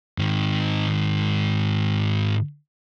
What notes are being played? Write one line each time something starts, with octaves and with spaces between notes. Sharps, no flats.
G#2 D#3